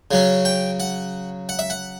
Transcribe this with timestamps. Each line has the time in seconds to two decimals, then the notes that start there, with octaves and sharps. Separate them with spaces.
0.11 C#3 F#3 C#4
0.45 G5
0.80 F#5
1.49 F#5
1.59 E5
1.70 F#5